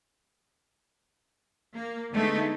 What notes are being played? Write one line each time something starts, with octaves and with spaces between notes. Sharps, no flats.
A#3
D3 G#3 A3 B3 D#4